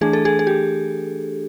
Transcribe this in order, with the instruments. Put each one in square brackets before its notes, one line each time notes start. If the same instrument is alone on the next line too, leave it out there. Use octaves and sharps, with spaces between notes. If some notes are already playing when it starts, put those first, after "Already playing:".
[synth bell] E3 A3 D4 G#4
A4
G#4
G#4
G4